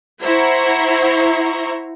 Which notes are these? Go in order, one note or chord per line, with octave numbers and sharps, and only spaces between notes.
E4 C5 F#5 A#5 C#6